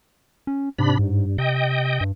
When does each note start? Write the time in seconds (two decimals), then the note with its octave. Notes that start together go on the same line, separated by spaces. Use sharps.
0.47 C#4
0.79 G#2 C3 D4 B5
0.99 G2
1.38 C3 D#5 G5
2.01 G2